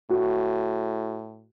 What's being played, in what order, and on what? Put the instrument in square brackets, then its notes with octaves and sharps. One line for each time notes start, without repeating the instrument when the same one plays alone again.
[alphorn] A2 [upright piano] F#4